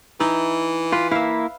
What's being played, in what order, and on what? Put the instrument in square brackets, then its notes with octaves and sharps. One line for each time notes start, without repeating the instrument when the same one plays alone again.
[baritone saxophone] E3 [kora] D#4 E4
[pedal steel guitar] F4 [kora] B4
[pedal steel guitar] A#3 E4 [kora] E5 F5